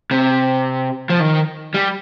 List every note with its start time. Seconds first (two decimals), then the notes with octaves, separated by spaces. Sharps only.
0.11 C3
1.09 F3
1.20 D#3
1.74 G3